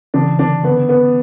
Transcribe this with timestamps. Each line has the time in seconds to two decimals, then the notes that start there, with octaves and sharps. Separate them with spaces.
0.14 C#3 E3 D4
0.39 D3 D4
0.64 D3 B3
0.89 B3